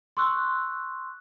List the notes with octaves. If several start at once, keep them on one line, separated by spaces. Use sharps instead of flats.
C6 C#6 E6 F#6